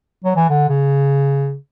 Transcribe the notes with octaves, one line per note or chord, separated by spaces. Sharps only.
F#3
E3
D3
C#3